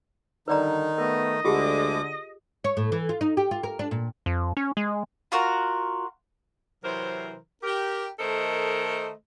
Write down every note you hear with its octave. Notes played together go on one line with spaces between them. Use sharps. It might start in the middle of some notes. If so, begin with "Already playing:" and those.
G2 D3 D#3 D#4 B4 D5 A#5
A3 B3 A#4 D#5
D2 D3 G#3 F4 G4 G#4 D6
C#5
A2
E3
F4
D#4
G4
F4
A#4
D4
A#2
F2
C#4
G#3
F4 F#4 A#4 F#5
C3 E3 F#3 A#4 C5
G4 A#4
D#3 A3 A4 A#4 C5 D#5